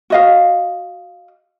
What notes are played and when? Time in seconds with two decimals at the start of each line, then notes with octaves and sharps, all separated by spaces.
0.10 F#4 D#5 F5